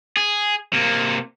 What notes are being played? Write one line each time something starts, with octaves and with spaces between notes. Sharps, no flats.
G#4
C3 A#3